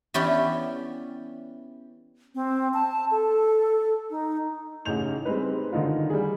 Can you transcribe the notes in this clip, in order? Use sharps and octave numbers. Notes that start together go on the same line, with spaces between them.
E3 B3 C#4 G4 D5 G5
C4
A5
A4
D#4
A1 C#3 D#4 G6 F7
G3 G#3 C4 D#4 B4
D3 D#3 D#4 F4
G3 G#4